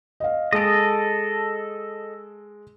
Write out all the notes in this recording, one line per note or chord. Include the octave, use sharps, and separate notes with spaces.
D#5 F5
G#3 A4 D#5 D7